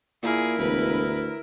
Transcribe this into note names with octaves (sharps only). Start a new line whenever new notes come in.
A#2 E4 G#4 A#4
E1 D2 B4